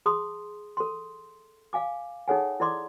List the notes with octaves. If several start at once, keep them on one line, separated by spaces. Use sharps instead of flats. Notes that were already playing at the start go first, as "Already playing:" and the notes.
G#4 A5 C6 D#6
A4 C6
F5 G#5 D6
D#4 G#4 A4 C#5 F#5 G#5
E4 A4 D5 C6 D6